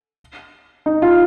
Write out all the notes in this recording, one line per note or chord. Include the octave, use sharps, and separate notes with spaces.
D#4
F4